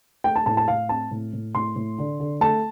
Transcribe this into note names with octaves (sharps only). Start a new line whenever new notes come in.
A3 G5
A5
A2 A5
A5
A2 F5
C4 A5
A2
A2
A2 C6
A2
D3
D3
A3 A5